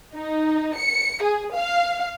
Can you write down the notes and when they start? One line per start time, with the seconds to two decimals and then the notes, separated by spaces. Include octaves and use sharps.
0.15 D#4
0.77 C#7
1.23 G#4
1.54 F5